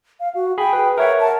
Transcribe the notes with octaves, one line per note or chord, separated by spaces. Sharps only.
F5
F#4
G#4 G5 B5
B4
A#4 C#5 E5 F#5
A5